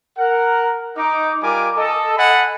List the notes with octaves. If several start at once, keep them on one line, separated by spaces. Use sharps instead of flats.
A#4 F#5
D#4 D6
G3 F4 A#4 G#5 D6
A4 D#5
A4 D#5 F#5 G#5 A5 B5